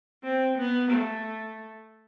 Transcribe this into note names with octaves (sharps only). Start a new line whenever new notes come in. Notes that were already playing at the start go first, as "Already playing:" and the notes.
C4
B3
A3